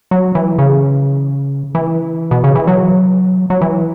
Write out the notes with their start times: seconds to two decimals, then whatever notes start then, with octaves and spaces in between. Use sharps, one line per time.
0.11 F#3
0.35 E3
0.59 C#3
1.75 E3
2.31 B2
2.44 C#3
2.55 E3
2.67 F#3
3.50 F#3
3.61 E3